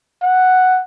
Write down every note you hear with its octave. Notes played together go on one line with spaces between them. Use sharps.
F#5